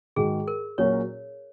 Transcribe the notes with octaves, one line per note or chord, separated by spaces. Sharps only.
G#2 D#3 G#3 F#4 G#4
A#4
A#2 F#3 C#4 F#4 A#4 C#5